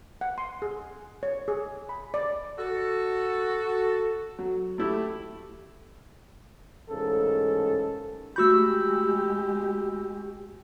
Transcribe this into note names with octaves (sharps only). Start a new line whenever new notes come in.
F#5
C6
G#4
C#5
G#4
B5
D5
F#4 A4
F#3
A3 E4 G4
A1 G#2 C#3 A4 A#4
G#3 A3 F#4 G4 B5 C#6 E6 G6